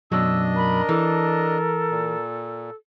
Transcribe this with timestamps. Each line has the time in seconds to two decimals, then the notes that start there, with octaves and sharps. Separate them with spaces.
0.12 F#2 B2 F#3 D4 D#5 E6
0.56 A#4 B5
0.89 E3 A4
1.91 A#2